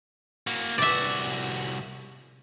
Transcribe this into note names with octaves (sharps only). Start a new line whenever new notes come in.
A#3 F#4
C2 F#4 D5 E5